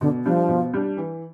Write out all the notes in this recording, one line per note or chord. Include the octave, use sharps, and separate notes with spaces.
B2 D3
F3 G3 D4
B2
G3 D4
E3